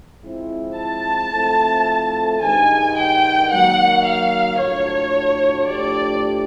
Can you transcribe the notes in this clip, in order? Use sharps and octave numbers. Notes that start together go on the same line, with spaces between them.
F3 G#3 C4 E4
A5
F3 A3 C4 E4 A4
G2 D#3 G#3 G#5
G5
D#3 F#3 A#3 F#5
F5
A2 F3 A3 D4 F#4 C#5
A2 F3 A3 D4 G4 D5